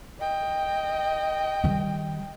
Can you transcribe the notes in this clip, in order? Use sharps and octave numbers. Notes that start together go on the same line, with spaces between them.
D#5 G5
D#3 G3